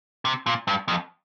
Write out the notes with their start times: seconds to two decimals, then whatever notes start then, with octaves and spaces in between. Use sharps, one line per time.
0.25 C3
0.46 A#2
0.67 G2
0.88 F2